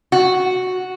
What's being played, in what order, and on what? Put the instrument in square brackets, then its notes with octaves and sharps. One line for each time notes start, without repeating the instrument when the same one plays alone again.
[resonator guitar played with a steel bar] F#4